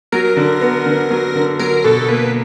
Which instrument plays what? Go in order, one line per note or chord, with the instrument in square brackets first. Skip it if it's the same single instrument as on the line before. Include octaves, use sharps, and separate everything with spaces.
[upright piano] F#3 [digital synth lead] A#4
[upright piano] D3
B3
D3
F#3
D3
[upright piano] F#3 [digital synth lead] A#4
[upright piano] B2 [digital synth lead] A4
[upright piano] A#3 [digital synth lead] B4